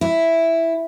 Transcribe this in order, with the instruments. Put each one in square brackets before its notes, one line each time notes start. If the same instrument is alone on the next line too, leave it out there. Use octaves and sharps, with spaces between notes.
[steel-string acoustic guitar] E4